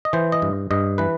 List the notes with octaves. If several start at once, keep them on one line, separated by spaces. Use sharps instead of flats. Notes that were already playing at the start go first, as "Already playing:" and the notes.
D#5
E3 C5
D#5
G2
G2 D#5
E3 B4